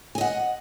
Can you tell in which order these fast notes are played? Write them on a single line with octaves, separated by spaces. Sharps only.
G#5 D#5 F#5